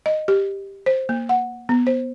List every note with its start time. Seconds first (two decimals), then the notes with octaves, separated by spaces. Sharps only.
0.06 D#5
0.28 G4
0.86 C5
1.09 A#3
1.29 F#5
1.69 B3
1.87 C5